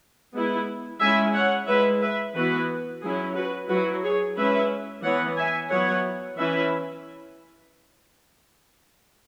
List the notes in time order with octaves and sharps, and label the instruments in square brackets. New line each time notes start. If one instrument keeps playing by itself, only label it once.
[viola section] G#3 B3 E4
G#3 C#4 E4 E5 G#5
C#5 F#5
G#3 E4 B4 E5
B4 E5
E3 B3 E4 F#4 B4
F#3 C#4 E4 G#4
F#4 B4
F#3 E4 F#4 B4
G#4 C#5
G#3 C#4 E4 B4 E5
E3 B3 E4 C#5 F#5
E5 G#5
F#3 B3 E4 C#5 F#5
E3 C#4 E4 B4 E5